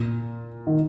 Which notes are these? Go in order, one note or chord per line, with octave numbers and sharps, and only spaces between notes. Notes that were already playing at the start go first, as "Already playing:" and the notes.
Already playing: A#2
D#3